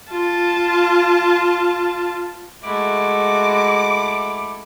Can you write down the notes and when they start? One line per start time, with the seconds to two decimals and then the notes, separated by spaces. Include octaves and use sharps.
0.10 F4 A5
2.63 G#3 A3 E4 F#4 D6